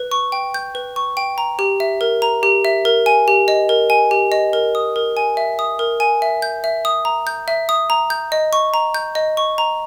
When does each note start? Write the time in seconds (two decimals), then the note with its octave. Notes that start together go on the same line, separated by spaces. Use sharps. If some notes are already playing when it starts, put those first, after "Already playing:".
Already playing: B4
0.11 C#6
0.32 G5
0.54 G6
0.75 B4
0.96 C#6
1.17 G5
1.38 A#5
1.59 G4
1.80 E5
2.01 A#4
2.22 A#5
2.43 G4
2.65 E5
2.85 A#4
3.06 G#5
3.28 G4
3.48 D#5
3.69 A#4
3.90 G#5
4.11 G4
4.32 D#5
4.53 A#4
4.75 D#6
4.96 A#4
5.17 G#5
5.37 E5
5.59 D#6
5.79 A#4
6.00 G#5
6.22 E5
6.42 G6
6.64 E5
6.85 D#6
7.05 A#5
7.27 G6
7.48 E5
7.69 D#6
7.90 A#5
8.10 G6
8.32 D#5
8.53 C#6
8.74 A#5
8.94 G6
9.15 D#5
9.37 C#6
9.58 A#5